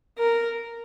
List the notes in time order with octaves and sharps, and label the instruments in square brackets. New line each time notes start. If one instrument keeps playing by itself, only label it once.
[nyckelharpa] A#4